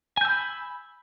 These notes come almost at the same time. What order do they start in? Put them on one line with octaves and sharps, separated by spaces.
G#5 G6 E6 B5